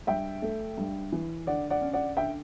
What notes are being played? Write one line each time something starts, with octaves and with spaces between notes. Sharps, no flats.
G2 E5 G5
A3
G2
E3
D3 D5 F#5
D5 F#5
C#4
D5 F#5
D3 E5 G5